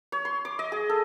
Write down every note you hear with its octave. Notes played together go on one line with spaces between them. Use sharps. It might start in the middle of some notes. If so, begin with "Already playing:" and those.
C#5
C6
D6
D#5
G#4
A4